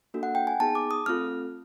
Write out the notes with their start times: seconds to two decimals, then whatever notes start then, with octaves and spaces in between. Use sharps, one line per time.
0.14 A#3 D4 F#4 A4
0.23 F#5
0.35 G5
0.47 G#5
0.60 B3 D#4 G#4 A5
0.75 D6
0.91 D#6
1.06 A3 C4 F4 A4 F6